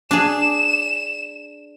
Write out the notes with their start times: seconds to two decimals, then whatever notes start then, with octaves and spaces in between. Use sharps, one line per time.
0.11 D4 G#4 E7